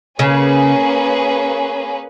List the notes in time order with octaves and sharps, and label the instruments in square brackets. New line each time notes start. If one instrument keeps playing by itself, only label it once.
[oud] C#3 [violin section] A#3 C#4 G#4 B4